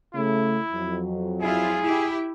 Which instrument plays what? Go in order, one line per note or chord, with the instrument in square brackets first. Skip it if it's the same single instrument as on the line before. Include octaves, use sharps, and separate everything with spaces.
[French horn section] C#3 A3 [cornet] E4
[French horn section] F2 F#3
[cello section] E4 F4 [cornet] G#4
[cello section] E4 G4